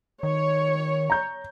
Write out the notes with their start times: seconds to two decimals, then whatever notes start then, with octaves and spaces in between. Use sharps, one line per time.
0.23 D#3 C#5
1.10 A#5 G6